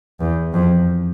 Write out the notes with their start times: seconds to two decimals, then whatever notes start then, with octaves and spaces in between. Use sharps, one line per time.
0.20 E2
0.54 F2